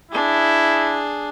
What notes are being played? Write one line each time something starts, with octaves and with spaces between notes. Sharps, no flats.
D4 E4 G#4